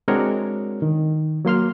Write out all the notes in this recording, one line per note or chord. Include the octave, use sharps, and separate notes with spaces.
G#3 C4 D4 F#4 A#4 C#5
D#3
F#3 A#3 C6 F6